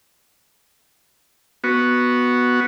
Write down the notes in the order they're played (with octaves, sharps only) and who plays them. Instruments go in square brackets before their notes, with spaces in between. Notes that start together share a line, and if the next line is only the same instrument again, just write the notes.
[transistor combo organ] B3 F#4